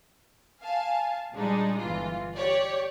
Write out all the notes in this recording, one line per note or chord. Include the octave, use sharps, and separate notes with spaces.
F5 G#5 A5
A#2 G3 G#3 D4 D#4
G1 E3 F4
G4 C#5 D5